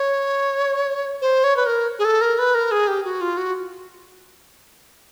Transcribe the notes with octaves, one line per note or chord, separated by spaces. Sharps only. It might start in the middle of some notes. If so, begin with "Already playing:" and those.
Already playing: C#5
C5
C#5
B4
A#4
G#4
A4
A#4
B4
A#4
G#4
G4
F#4
F4
F#4